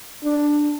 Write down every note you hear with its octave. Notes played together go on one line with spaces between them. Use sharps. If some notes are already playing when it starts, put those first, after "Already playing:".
D4